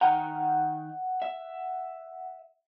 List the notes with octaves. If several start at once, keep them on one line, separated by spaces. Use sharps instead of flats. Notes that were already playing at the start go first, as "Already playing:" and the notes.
D#3 F#5 G5 A#5
E5